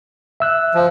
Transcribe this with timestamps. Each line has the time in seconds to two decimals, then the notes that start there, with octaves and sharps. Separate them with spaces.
0.40 E5 E6 F#6
0.75 F3